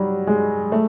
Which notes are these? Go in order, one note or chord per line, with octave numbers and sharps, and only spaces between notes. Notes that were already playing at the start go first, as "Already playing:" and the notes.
Already playing: F#3 G3
G#3
A3